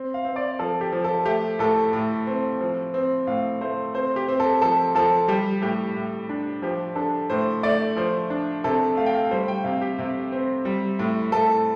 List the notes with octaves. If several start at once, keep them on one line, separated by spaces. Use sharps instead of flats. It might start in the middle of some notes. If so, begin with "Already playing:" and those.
Already playing: C4
F5
C4
D5
F3 A4
G4
F3
A4
A3 G4
A2 A4
A2
C4
F3
C4
A2 F5
A3 C5
C4 C5
G4
C4
A4
F3 A4
F3 A4
G3 G4
A2 G4
A2
D4
F3 G4
D4 A4
A2 C5
A3 D5
F3 C5
D4
C3 A4
A3 F5
G5
F5
G3 C5
G5
C3 F5
G4
C3
C4
G3
A2
A2 A4